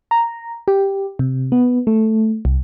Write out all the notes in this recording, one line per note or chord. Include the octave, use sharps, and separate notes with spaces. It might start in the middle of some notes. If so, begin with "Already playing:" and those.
A#5
G4
C3
B3
A3
C2